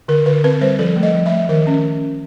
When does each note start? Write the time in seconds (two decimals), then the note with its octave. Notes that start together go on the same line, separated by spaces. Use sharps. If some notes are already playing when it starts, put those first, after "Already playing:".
0.08 D3 A#4
0.26 D3 B4
0.44 C4 B4
0.61 G3 C5
0.79 F3 A4
0.96 A3
1.03 D#5
1.14 F3
1.26 E5
1.32 A3
1.49 D#3 A#4
1.67 C#4